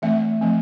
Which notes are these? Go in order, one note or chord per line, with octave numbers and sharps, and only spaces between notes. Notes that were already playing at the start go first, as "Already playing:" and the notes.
E3 A3 C4 E5
F3 A3 C4